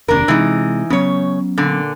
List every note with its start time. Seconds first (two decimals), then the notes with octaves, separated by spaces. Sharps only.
0.08 F1 D#2 C3 D4 A#4
0.28 C3 E3 G#3 D#4
0.90 C#3 F#3 B3 C#4 C#5
1.58 A#2 D3